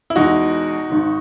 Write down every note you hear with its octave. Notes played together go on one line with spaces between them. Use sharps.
E4
E2 B2 G#3 D#4 F#4
G#1 G#2 D#3